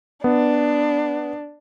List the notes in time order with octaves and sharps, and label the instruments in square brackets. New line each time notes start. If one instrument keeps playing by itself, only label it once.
[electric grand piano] B3 [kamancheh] D4